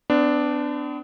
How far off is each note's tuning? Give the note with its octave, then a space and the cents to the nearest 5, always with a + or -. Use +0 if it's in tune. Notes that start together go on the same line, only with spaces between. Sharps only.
B3 +45 D4 +0